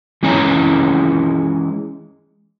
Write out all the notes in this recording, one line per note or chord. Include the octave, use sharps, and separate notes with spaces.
E3 G#3 C#4 C#5 D#5 A#5